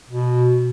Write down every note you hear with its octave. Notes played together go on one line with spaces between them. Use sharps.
B2